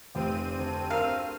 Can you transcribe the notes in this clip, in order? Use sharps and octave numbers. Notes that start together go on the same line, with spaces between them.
F1 C4 G4 D5 D#7
D2
A#4 F5 E6